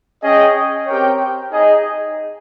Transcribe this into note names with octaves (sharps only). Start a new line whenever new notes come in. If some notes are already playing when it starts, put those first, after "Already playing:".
C#4 G#4 D#5 G5
C4 G4 A#4 C#5 G5
D#4 G#4 D#5